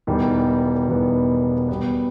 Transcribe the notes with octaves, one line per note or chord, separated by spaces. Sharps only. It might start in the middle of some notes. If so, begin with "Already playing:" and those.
E1 E2 D#3 G3 B3
E1 E2 D#3 G3 B3
B2 G3 B3